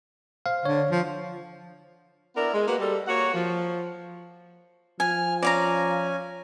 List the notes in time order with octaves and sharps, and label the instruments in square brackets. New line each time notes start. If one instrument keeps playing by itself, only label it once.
[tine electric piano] C5 F5
[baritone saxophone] D3 [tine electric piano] C#5
[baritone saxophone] F3
[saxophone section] B3 D4 E4 A#4
G#3
A#3 F#4 B4
G3 A4
A#3 F#4 C#5 F#5
F3
[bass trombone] F3 [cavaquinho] G#5 [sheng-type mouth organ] F6
[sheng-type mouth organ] C#4 G#5 [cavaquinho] D5 F5 A#5